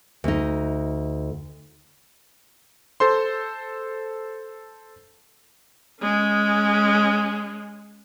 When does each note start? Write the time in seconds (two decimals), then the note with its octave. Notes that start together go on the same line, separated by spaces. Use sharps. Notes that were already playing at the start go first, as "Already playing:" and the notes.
0.24 D2 D#4
3.00 A4 C5 C6
6.01 G#3 C#4